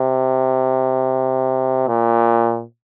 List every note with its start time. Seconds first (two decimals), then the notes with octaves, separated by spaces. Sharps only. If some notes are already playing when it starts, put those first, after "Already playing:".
Already playing: C3
1.87 A#2